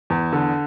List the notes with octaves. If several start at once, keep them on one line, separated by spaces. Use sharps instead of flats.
E2
D3